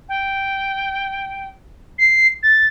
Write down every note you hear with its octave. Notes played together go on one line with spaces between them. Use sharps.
G5
C7
A6